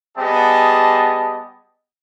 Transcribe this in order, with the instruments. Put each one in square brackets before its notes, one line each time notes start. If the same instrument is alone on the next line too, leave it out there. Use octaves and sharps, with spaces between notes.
[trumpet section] G3 B3 G4 G#4 D#5 A5